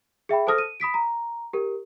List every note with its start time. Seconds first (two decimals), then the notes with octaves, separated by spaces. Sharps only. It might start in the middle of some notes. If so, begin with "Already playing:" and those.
0.29 G#4 E5 G5 B5
0.47 A4 C5 A5 D#6 F6 A#6
0.58 D#7
0.80 B5 D#6 B6 D7
0.94 A#5
1.53 G4 A#4